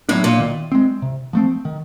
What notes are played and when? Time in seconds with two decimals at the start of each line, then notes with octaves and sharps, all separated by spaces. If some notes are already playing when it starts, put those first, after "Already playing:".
0.09 A2 F#3 B3 D4
0.24 A#2
0.40 D#3
0.72 G#3 C4
1.02 C3
1.33 F3 A3 C4
1.65 D#3